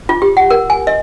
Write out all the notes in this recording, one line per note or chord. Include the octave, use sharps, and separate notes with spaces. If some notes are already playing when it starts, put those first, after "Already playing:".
F4
G4
F#5
A#4
G#5
D#5